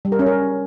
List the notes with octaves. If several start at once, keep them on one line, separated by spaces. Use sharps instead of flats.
G3
A#4
C#4
A#4